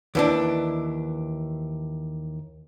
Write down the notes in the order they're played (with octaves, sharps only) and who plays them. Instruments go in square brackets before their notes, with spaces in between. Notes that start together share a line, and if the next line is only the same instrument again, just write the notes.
[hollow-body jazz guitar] D#2 E3 D4